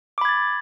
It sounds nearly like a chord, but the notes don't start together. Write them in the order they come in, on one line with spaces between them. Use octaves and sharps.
D6 B5 G#6 A6